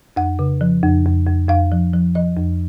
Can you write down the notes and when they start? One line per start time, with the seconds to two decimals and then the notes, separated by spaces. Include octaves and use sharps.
0.16 F2 F#5
0.39 C#3
0.61 F3
0.83 F2
1.05 F2
1.27 F2
1.49 F2 F5
1.72 F3
1.94 F3
2.15 F3 D#5
2.37 F2